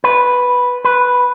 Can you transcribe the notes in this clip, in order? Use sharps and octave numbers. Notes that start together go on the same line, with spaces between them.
B4
B4